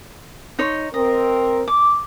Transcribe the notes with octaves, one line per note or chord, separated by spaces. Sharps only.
D#4 C#5 C6
C4 A#4 D#5
D6